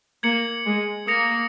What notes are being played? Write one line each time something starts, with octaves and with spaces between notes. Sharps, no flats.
A#3 G#6 C#7 F#7
G#3
A#3 D#6 A#6 C#7 F7